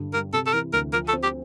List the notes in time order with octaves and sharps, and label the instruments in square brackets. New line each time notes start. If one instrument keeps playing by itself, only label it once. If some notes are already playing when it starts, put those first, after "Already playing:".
Already playing: [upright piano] G2 D3
[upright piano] G3 [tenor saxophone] A#4
[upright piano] C3 [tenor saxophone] A4
[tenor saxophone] A4
[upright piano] E3 [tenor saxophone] A#4
[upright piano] D2 [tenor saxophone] A#4
[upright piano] F3 [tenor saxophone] A#4
[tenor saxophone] A4
[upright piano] C4
[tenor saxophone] G4